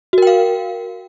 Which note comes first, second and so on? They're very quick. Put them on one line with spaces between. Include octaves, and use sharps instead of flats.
F#4 A#4 G5 F5